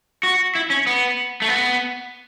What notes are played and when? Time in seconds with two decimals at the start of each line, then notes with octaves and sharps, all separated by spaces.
0.23 F#4
0.55 E4
0.70 C#4
0.87 B3
1.42 A3
1.48 B3